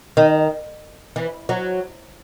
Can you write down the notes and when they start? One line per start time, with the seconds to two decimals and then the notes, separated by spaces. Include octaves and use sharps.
0.17 D#3
1.16 E3
1.49 F#3